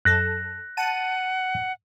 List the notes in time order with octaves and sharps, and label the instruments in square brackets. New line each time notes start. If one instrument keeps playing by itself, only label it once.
[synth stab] F#2 A4 [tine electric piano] F#6 A#6
[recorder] F#5 [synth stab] A5 D#7